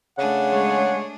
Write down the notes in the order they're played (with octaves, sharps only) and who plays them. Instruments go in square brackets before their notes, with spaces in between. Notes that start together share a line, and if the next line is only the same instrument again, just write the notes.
[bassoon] C#3 [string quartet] A3 D4 G#4 [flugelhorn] F#5
[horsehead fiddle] G#3 C#5